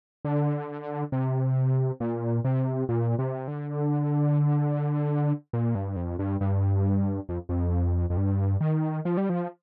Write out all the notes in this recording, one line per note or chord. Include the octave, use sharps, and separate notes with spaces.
D3
C3
A#2
C3
A#2
C3
D3
A#2
G2
F2
G2
G2
F2
F2
F2
G2
D#3
F3
G3
F3